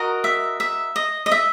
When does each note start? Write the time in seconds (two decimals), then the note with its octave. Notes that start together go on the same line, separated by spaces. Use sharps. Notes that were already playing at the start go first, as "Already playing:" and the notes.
Already playing: F#4 A#4 D#5
0.24 E5
0.60 E5
0.96 D#5
1.26 D#5
1.32 E5